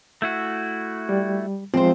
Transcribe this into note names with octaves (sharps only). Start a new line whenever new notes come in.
A3 E4 F#4
G3
F3 G#3 C4 C5